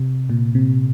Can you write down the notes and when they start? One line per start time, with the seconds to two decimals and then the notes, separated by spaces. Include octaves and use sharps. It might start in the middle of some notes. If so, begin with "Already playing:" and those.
Already playing: C3
0.30 A#2
0.55 C3